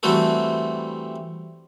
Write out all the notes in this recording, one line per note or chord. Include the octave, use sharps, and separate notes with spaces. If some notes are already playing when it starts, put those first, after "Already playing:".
E3 G3 A3 C4 F#4 A4